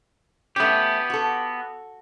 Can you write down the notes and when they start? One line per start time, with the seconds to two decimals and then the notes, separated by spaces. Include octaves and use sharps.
0.56 A3 B3 C#4 G4
1.10 F#4 A4